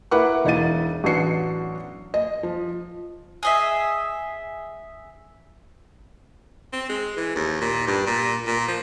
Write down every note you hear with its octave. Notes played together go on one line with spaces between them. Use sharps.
E4 A#4 B4 E5 F#5 D6
E1 D#4 E4 F5 A6 D#7
A1 F#3 B3 D4 C7 C#7
D#5
F3
G#4 D#5 E5
C4
G#3
E3
D#2
A#2
G2
A#2
A#2
F3